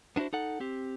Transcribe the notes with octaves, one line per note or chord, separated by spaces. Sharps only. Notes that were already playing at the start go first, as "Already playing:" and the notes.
B3 D4 E4 F#4 C5
D#4 A4 F#5
C4 G4